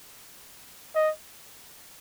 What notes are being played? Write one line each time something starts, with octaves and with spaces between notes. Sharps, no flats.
D#5